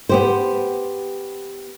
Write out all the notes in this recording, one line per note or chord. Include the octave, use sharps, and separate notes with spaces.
B3 G4 C5